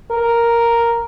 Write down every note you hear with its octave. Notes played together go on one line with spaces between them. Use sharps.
A#4